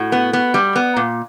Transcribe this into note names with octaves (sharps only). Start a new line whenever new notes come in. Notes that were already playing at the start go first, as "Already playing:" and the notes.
Already playing: A2 F#4
B3
B3
G3
B3
A#2